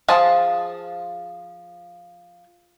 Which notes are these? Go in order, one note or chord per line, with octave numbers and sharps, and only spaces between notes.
F3 G#4 F5 A5